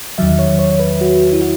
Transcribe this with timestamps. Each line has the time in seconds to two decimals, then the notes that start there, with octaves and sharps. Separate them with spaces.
0.18 E2 D#3 F#3 E5
0.39 C#5
0.59 C#5
0.79 B4
1.01 F#4
1.33 E4
1.41 F#4